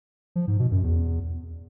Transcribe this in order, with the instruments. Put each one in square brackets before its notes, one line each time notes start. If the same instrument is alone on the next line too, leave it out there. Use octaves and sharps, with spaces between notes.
[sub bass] F3
G#2
B2
F#2
E2